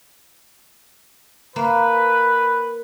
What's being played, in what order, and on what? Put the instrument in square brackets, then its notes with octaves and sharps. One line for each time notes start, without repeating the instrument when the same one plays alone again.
[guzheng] A#3 [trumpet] B4